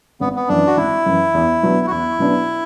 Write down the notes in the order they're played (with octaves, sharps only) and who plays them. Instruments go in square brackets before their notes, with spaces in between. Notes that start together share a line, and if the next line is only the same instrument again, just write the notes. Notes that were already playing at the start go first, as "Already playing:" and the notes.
[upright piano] G#1 [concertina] B3
[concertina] B3
[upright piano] F#2 E3 [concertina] D4
[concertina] F#4
[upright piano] G#1 [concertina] E4
[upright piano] F#2 E3
E2
B2 F#3 B3 D4
[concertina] F#4
[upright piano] E2 [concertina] E4
[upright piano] B2 F#3 B3 D4